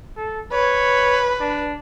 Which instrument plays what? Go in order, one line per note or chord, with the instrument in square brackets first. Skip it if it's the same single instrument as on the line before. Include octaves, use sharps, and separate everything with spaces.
[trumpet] A4
[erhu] B4 [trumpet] C#5
[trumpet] D4